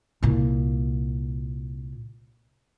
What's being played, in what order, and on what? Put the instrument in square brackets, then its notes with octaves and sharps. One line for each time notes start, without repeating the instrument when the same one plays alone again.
[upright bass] C2 A#2